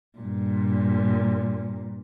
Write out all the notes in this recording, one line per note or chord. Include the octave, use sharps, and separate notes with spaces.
G2 A#2